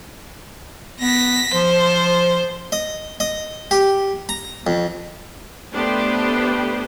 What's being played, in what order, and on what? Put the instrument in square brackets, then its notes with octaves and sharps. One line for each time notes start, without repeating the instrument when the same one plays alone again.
[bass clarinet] B3 [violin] A#6 B6
[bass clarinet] F3 [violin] C5
[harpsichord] D#5
D#5
G4
A#5
F2
[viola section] A3 B3 D4 G4 B4 C5